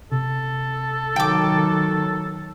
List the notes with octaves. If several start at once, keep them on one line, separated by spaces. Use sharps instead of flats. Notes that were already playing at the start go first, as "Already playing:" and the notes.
C3 A4
D#3 F#3 G5 D6